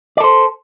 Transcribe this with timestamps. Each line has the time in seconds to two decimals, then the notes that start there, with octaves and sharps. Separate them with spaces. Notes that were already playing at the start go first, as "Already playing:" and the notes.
0.17 D5
0.20 A4
0.24 C5